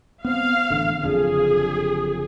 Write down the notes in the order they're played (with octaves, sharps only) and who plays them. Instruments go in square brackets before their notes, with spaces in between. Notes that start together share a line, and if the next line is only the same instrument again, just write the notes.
[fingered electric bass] B3 C4 [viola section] F5
[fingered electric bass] A1 D3
[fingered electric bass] F#1 F2 D3 [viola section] G#4